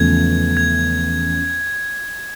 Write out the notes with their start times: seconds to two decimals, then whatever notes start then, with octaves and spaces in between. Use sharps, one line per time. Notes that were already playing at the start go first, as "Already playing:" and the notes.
Already playing: E2 C#3 F3 A3 G#6
0.57 G#6